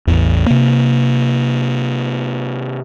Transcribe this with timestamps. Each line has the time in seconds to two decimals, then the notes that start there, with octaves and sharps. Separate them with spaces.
0.07 A1 E2
0.46 C3 A#3